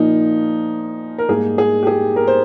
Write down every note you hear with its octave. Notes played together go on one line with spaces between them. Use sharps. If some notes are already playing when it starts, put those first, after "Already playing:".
Already playing: A#2 F3 A#3 D#4
A#4
G#2 G3 A#3 G#4
G#4
G4
G#4
A#4
C5